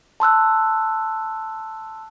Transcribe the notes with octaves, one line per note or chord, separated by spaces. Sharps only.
A5 C6 E6 F#6